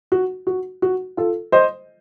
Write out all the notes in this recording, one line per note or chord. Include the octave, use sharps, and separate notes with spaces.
F#4
F#4
F#4
F4 A4
C5 D#5